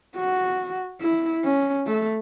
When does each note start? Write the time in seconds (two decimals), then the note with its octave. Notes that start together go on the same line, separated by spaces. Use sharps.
0.16 F#4
1.01 E4
1.44 C#4
1.87 A3